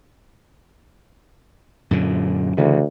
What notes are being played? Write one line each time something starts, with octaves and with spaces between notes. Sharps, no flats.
F#2 A#2 D3
D2 C#3 E3